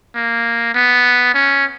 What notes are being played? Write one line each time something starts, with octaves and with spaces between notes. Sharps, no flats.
A#3
B3
C#4